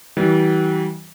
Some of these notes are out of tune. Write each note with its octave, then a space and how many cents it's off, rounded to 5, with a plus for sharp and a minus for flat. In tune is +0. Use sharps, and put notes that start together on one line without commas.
E3 -35 G3 -40